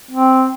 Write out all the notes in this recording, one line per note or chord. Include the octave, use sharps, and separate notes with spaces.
C4